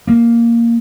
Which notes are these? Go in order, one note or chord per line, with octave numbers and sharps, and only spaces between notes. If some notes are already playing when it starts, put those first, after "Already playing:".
A#3